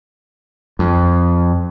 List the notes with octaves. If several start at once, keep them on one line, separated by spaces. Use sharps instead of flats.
F2